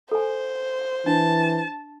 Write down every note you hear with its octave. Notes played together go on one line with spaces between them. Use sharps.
A4 C5 G#5
E3 D4 A5